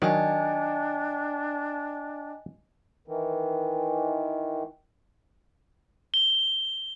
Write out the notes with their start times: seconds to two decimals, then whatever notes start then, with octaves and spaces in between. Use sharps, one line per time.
0.02 D#3 F#3 D4 D5 D#5 G5 G#5
3.08 D#3 E3
6.14 G7